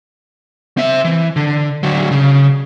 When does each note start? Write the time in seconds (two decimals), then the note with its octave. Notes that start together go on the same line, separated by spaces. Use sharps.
0.77 C4 E5
1.05 E3
1.36 D3
1.83 D3 F#3
2.11 C#3